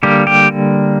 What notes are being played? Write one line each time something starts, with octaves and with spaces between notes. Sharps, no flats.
D3 G3 A#3 G4
G4